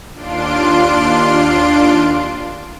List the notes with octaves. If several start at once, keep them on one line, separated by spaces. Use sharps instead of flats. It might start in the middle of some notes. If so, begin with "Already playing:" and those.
D#2 D4 F4 C6 D7